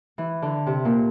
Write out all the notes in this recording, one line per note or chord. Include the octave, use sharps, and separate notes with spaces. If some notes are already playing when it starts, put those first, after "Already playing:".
E3
D3
C3
A#2